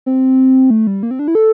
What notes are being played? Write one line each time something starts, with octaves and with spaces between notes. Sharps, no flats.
C4
A3
G3
A#3
C4
D4
E4
A4